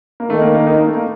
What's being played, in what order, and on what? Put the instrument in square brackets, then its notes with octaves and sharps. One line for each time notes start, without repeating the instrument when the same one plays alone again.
[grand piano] A#3
[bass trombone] D#3 [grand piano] A3
[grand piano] A#3
A#3
D#4
A#3
A3
A#3